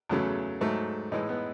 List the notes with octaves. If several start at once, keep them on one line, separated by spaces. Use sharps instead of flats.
E2 C#3 F#3 A3
G#2 F#3 A3
A2 E3 G#3 D#4
B3